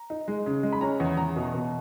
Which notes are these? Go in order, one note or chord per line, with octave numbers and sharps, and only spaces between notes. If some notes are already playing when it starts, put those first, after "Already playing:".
Already playing: A#5
D#4
G#3
C#3
G#3
B5
C#4 A#5
E2
E2 A#5
B2
B2